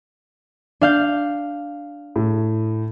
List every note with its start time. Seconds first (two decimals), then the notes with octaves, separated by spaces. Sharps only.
0.81 D4 F5 G6
2.16 A2